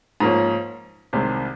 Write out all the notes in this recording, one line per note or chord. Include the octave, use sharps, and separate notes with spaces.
G#2 F3 A#3 C#4
C2 C3 D#3 G#3